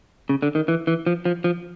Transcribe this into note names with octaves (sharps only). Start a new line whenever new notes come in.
C#3
D3
D#3
E3
E3
F3
F3
F3